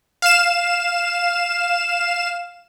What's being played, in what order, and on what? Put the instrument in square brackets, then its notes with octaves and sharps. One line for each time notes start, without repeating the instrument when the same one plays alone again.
[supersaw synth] F5 E7